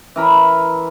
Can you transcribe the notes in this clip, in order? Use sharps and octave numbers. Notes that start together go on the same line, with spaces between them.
E3 A#4 B5